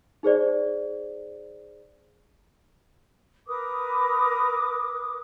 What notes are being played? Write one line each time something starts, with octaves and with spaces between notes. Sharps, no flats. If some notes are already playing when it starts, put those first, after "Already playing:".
D#4 G#4 C5 D5
A#4 B4 D6 D#6